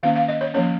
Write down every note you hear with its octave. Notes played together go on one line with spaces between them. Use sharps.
D#3 A#3 C#4 F5
F5
D#5
C#5
F3 A#3 C#4 C#5